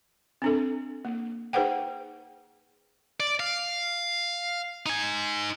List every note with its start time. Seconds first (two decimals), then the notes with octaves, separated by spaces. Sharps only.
0.42 C4 D4 A4
1.05 A#3
1.53 D#4 G#4 B4 C5 F#5 G5
3.20 D5
3.40 F5
4.86 D#4 G#5